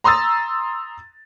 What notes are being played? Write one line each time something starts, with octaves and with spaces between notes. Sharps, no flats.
A#5 C6 D#6 E6 A6